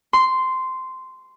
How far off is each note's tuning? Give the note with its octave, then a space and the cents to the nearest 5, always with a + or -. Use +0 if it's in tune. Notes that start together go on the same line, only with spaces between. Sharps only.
C6 -10